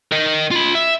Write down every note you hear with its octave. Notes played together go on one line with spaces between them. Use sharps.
A#4 D#5
F4 B5
E5